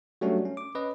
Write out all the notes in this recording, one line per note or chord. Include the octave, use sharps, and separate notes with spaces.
F#3 G3 A3 C#4 D4 F#4
C#4
D6
C#4 B4 D#5